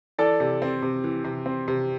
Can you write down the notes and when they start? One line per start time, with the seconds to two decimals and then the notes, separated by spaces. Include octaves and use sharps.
0.18 E3 A4 D5
0.40 C3
0.62 C4
0.83 C3
1.04 E3
1.24 C3
1.46 C4
1.68 C3